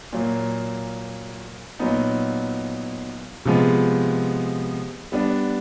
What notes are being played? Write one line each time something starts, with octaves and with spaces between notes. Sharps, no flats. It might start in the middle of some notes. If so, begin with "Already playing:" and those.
A#2 F#3 A#3
A#2 F#3 B3 D#4
C3 F3 G#3 B3
G3 B3 D4